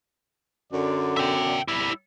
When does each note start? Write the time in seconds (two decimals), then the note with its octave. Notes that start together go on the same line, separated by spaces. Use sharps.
0.73 F#2 D3 D5
1.17 E5 G5
1.68 G3 E4